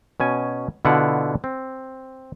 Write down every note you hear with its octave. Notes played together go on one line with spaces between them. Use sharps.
B2 C#4 G#5
B2 D3 E4 F4 F#5
C4